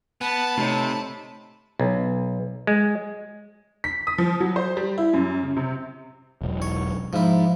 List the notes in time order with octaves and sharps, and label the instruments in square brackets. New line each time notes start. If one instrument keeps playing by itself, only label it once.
[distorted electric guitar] B3 [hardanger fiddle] A5 B5
[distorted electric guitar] C3 [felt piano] A3 D#4 C#5
[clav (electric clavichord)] B1
G#3
[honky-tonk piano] B6
D#6
F3
F#3
C5
G3
E4
F#2
C#3
C3
[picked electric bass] E1 B1
[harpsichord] C#5
[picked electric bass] G#2 [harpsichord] F3 E4